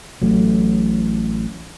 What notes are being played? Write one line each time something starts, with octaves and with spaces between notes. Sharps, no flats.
A1 A2 F#3